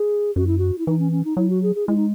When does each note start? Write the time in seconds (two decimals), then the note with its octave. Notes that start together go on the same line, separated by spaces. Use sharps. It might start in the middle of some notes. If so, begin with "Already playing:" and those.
Already playing: G#4
0.36 F#2 F#4
0.47 E4
0.58 F#4
0.78 E4
0.87 E3 D#4
0.99 C#4
1.12 C#4
1.24 D#4
1.37 F#3 E4
1.49 F#4
1.63 G#4
1.75 G#4
1.87 G#3 E4
1.96 D#4